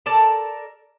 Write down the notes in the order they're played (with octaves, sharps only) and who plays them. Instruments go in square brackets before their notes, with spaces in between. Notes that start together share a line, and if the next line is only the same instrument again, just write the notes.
[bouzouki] A4 A#4 D5 A5